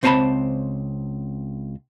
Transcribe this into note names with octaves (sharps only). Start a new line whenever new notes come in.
C#2 C4 C5 G#5 A5 B5